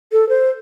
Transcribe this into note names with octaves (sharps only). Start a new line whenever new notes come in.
A4
C5